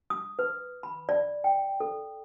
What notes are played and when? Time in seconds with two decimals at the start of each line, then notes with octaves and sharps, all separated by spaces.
0.10 D#6
0.39 B4
0.83 B5
1.09 D5
1.44 G5
1.80 A4